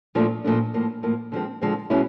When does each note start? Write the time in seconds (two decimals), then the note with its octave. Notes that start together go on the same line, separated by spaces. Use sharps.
0.15 A#2 F3 A3 D4
0.44 A#2 F3 A3 D4
0.74 A2 F3 A#3
1.03 A2 F3 A#3
1.32 D3 F3 G#3 C4
1.61 D3 F3 G#3 C4
1.90 B2 G#3 C#4 E4